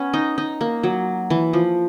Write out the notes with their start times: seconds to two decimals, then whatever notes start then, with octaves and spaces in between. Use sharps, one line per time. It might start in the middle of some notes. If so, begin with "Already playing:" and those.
Already playing: B3 C#4
0.13 D#4
0.38 D#4
0.61 A#3
0.83 F#3
1.30 E3
1.53 F3